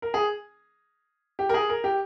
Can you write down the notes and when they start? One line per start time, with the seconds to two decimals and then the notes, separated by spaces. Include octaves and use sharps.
0.02 A#4
0.14 G#4
1.39 G4
1.49 A#4
1.54 G#4
1.69 A#4
1.84 G4